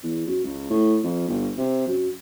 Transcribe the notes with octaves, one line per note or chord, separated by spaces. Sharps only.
E2
F#2
C#2
A2
F2
G1
C3
F#2